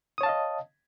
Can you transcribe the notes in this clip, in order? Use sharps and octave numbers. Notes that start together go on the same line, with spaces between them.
C#5 D#5 F5 A5 D#6